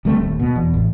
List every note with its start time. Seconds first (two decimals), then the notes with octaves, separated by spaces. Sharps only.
0.05 D2 G3 A3 C4
0.19 D#1 D#2
0.39 B2
0.56 E2
0.74 A1